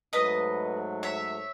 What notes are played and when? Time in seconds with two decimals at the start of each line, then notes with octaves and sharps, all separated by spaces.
0.13 G#2 F#3 A3 B4 D#5
1.03 C#5 E5